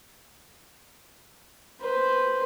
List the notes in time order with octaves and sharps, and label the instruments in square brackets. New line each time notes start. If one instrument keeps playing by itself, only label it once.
[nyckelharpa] B4 C5